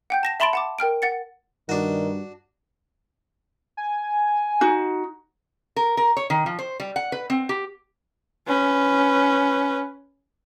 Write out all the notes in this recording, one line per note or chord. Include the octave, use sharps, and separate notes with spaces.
F#5 G5 G6
A5 A#6 E7
E5 A5 B5 C6 A6 D7
F#5 A5 D6
A#4 G5 F6 D7
F#5 A6 C#7
G2 D#3 D4 F#4
G#5
D#4 F#4
A#4
A#4
C#5
D#3
F3
C5
G3
F#5
B4
C4
G4
C#4 B4